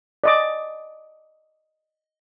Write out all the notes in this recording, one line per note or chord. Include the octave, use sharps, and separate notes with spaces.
D5 D#5 D6